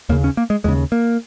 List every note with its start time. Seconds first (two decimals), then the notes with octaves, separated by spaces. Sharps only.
0.09 D#2 C#3 A#3
0.24 C#4
0.37 A#3
0.50 G#3
0.64 D#2 C#3 G#3
0.92 A#3